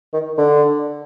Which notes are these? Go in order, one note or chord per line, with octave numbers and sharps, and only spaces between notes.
D#3
D3